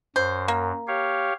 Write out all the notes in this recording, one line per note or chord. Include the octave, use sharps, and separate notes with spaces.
F#2 C5
A#3
G4 C#5 F5